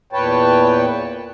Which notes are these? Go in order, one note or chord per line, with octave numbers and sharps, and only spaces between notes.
E2 A#2 B4 C#5 G5 A5